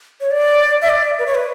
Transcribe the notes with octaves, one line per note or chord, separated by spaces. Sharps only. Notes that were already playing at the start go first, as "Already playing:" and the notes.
C#5
D5
E5
D5
B4
C#5
B4